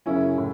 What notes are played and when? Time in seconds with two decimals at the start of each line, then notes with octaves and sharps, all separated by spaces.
0.06 F#2 C#3 F#3 C#4 E4
0.38 A2